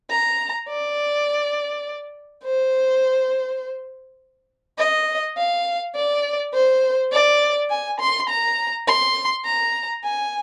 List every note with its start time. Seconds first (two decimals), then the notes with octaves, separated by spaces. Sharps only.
0.10 A#5
0.69 D5
2.44 C5
4.78 D#5
5.37 F5
5.95 D5
6.53 C5
7.12 D5
7.70 G#5
8.00 C6
8.29 A#5
8.87 C6
9.45 A#5
10.04 G#5